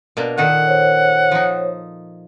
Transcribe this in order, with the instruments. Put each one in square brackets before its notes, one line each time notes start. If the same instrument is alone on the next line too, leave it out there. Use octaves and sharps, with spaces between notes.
[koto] B2 A#3 D4
[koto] A#2 D#3 A4 [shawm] F#5
[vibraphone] C5 C#5
[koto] F3 D#4